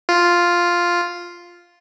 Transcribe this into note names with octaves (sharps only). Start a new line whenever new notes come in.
F4